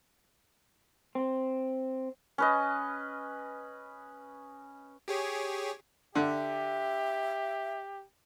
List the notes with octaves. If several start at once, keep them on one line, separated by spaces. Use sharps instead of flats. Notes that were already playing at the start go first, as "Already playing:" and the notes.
C4
C#4 B4 D#5
G4 G#4 C#5
D3 G4 E5